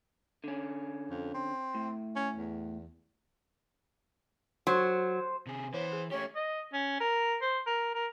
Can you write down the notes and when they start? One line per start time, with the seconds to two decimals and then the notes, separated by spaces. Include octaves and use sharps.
0.44 D3 C#4
1.10 F2
1.34 C4
1.75 A2
2.16 C#4
2.36 E2
4.67 F#3 C5
5.46 C3 G#4
5.74 E3 B3 C5 C#5
5.92 G#4
6.11 A3 C#4 G4 C#5
6.36 D#5
6.73 C#4
7.00 A#4
7.42 C5
7.66 A#4
7.95 A#4